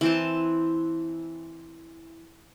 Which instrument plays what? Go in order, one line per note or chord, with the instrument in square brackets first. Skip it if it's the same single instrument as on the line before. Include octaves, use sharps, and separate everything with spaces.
[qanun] E3 C4 A5